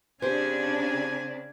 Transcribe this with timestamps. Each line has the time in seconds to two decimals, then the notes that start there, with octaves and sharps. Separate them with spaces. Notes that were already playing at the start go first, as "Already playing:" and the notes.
0.22 C#3 C4 D4 G4 C5 G#5